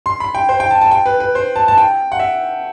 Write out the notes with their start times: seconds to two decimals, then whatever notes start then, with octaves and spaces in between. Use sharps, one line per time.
0.06 C6
0.20 B5
0.35 G5
0.49 C5
0.60 G5
0.71 A5
0.81 A5
0.91 G5
1.06 B4
1.20 B4
1.35 C5
1.56 A5
1.68 A5
1.78 G5
2.12 F#5
2.20 E5